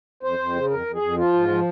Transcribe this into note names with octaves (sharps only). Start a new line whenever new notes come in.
F2 C5
F2
C#3
F2 A#4
F2
G#4
F2
F3 F4
G#2
F3